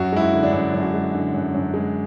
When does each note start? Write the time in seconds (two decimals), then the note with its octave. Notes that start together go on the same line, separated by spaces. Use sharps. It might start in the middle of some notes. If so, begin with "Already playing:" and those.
Already playing: F#2 F#4
0.13 G#3 E4
0.23 F#4
0.33 D3
0.43 D4
0.52 F#2 E4
0.74 F#2
0.83 F#4
0.94 G#3
1.13 D3
1.34 F#2
1.54 F#2
1.74 G#3